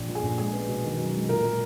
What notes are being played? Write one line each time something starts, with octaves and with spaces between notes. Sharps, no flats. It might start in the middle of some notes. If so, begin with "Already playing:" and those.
Already playing: A#1
A#2
G#4
A#1
G#3 G#4
B3
B2
D#3
F#2
G#3
A#2 A#4
A#2